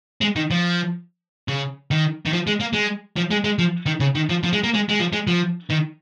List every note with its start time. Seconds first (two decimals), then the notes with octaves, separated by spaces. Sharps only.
0.21 G#3
0.36 D#3
0.51 F3
1.48 C#3
1.91 D#3
2.25 D#3
2.33 F3
2.47 G#3
2.61 A#3
2.74 G#3
3.16 F3
3.31 G#3
3.44 G#3
3.59 F3
3.86 D#3
4.00 C#3
4.15 D#3
4.29 F3
4.43 F3
4.53 G#3
4.64 A#3
4.74 G#3
4.89 G#3
5.00 F3
5.13 G#3
5.27 F3
5.70 D#3